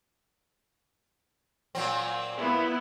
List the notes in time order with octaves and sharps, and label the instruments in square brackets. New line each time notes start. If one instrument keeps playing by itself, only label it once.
[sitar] A#2 F#3 C4
[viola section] B3 E4